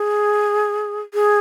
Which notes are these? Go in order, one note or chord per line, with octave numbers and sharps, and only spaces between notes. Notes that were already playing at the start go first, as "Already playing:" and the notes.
Already playing: G#4
G#4